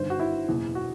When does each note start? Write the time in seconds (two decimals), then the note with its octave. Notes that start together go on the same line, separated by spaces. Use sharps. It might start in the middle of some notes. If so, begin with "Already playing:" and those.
Already playing: G1 G2 D#3 C5
0.10 F#4
0.20 E4
0.48 F#1 E2 B2
0.75 F#4